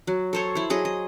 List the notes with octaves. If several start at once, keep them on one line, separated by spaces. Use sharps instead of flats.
F#3
A4 C5 C#5
E4 C5
F#3 G#4 D#5
D#5